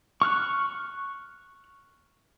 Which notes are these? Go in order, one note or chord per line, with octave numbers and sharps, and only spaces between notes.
C#6 F6 F#6